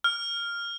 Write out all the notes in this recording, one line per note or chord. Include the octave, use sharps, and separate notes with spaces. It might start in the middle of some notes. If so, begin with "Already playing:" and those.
F6